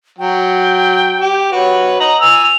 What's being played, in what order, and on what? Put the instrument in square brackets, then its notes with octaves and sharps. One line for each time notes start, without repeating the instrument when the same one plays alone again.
[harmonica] F#3 [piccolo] G5
[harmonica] G4
F#4 B4 C#5
[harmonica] D#5 A#5 [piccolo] F#7
[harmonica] G#5 E6 [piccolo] F7